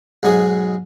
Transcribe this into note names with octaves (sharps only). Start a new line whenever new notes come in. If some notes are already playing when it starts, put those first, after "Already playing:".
B1 G#2 F#3 G#4 D#6